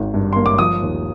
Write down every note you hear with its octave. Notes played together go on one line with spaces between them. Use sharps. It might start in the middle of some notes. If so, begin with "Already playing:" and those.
Already playing: G#1 D#3
G2
A#3 C6
D6
F3 D#6
D#2